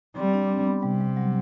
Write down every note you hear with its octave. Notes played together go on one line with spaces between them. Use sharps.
G3 C4
D4
C4
B3
C3 G3
G3
F#3